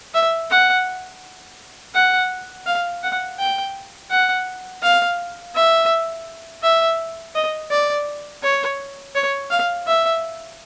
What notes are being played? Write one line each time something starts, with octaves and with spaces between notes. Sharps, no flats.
E5
F#5
F#5
F5
F#5
G5
F#5
F5
E5
E5
D#5
D5
C#5
C#5
F5
E5